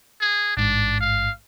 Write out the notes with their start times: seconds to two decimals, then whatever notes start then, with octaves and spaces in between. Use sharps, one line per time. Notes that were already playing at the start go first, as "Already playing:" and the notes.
0.20 G#4
0.57 A1 G#2 D4
1.00 F5